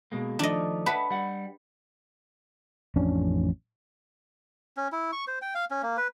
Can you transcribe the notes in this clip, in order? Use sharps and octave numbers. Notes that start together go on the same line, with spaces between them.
B2 G#3 A#3
D#3 F3 A3 D4 D#5
B4 E5 F#5 A5
G3 F#5
A1 F2 C#4 D4
C#4
E4
C#6
C5
G5
F5
C#4
A#3
B4